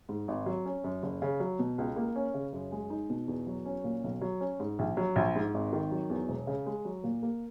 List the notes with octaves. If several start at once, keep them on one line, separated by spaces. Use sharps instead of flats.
G#2
G#1
F#3
C#4
F#2
F#1
C#3
F#3
B2
C#2
A#3
C#4
C#3
F#2
G#3
D#4
B2
E2
F#3
C#4
A#2
B1
F#3
C#4
G#2
A#1
F#3
A#1
G#2
G#1
D#3
F#3
E2
E1
C#3
G#3
F#3
A#2
A#3